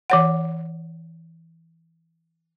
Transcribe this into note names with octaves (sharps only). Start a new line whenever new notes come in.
E3 C#5 F#5